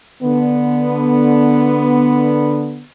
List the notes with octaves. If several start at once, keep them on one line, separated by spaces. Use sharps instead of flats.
D3 B3